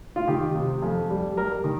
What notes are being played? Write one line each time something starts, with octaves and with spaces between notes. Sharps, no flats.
F4
D#3 G4
C3
F2
G3
G3 A#4
D#3